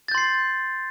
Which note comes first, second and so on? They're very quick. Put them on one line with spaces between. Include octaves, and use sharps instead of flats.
A6 G6 C6 C7